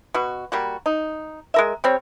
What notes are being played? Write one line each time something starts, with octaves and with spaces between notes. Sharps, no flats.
B2 F#4
G3 A#3 F#4
D#4
G#3 A#4 E5
G3 C4 C#5